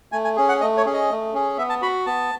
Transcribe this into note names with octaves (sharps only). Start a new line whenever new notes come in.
A3 G#5
G#5
C#4 G#4
F#5
A3 D#5
C#5
C#4 G#4
D#5
A3
C#4 G#4
B3 E5
A5
F#4 B5
B3 A5